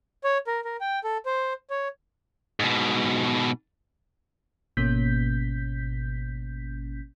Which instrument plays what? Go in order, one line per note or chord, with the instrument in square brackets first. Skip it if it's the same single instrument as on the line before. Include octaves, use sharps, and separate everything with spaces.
[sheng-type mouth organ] C#5
A#4
A#4
G5
A4
C5
C#5
[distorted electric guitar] G#2 B2
[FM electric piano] G#1 B2 A#3 C#4 G6 B6